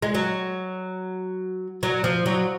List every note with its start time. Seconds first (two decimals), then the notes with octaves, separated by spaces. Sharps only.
0.02 G#3
0.15 F#3
1.83 F#3
2.04 F3
2.26 F#3